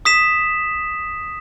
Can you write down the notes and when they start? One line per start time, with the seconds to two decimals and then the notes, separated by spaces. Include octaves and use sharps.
0.05 D#6 B6 E7